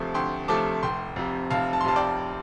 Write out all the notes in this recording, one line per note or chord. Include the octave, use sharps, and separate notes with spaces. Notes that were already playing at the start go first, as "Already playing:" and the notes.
Already playing: D2 C3 F3 A3
D2 G5 C6
C3 F3 A3 A5 D6
F1 G5 C6
F2 C3
F1 F5 A5
A5
C6
F2 C3 F5 A5
D5 G5